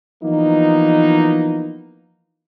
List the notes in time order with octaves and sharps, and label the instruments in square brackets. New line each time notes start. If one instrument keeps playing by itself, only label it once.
[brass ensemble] E3 F3 A#3 B3 D#4